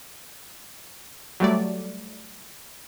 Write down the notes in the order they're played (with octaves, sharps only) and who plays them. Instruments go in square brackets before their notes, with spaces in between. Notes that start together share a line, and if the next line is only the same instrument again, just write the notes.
[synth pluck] F#3 G3 A3 D5